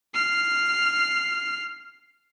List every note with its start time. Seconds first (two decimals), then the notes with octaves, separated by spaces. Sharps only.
0.14 F6 C7